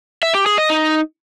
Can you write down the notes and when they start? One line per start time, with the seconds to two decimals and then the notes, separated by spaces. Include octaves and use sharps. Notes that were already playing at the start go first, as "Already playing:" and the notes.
0.23 E5
0.34 G4
0.46 G#4
0.58 D#5
0.70 D#4